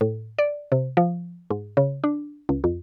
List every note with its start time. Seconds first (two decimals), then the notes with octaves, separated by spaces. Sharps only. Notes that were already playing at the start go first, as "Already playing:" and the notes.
0.01 A2
0.39 D5
0.72 C3
0.97 F3
1.50 G#2
1.77 C#3
2.04 D4
2.49 C#2
2.64 F2